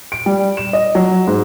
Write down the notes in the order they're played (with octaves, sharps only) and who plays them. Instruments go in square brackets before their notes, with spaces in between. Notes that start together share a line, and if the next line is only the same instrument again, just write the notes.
[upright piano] D7
G3
E7
D#5
F#3
G#2